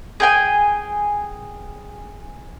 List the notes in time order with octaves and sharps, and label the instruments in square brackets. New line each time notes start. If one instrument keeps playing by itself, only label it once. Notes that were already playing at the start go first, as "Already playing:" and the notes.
[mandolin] G#4 G5 G#5